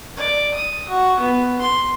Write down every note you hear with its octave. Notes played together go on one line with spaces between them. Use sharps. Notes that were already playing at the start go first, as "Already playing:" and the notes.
D5
D#6
F#4
B3
C6